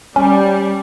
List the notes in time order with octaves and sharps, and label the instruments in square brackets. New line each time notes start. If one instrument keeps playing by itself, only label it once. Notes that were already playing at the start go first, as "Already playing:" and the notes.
[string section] G3 [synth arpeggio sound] C#4